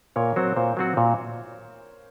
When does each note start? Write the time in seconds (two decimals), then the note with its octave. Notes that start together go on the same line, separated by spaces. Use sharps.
0.16 A#2 A#4 C#5
0.36 F#3 C4 F#4 C5
0.56 A#2 C5
0.77 F#3 C4 F#4
0.97 A#2